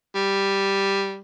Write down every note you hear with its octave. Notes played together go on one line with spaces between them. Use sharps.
G3